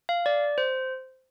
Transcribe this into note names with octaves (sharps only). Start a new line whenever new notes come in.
F5
D5
C5